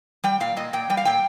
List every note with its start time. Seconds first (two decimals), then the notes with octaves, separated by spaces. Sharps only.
0.24 G3 G5
0.40 A#2 F5
0.57 A#2 D#5
0.73 A#2 G5
0.90 G3 G5
0.97 F5
1.05 A#2 G5